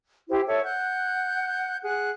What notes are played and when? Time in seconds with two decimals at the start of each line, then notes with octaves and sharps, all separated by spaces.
0.29 E4 G4 C5
0.47 A4 C#5 E5
0.63 F#5 F#6 G6
1.82 G#4 F#5 F#6